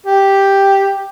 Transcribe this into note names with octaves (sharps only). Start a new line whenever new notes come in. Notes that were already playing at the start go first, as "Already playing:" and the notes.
G4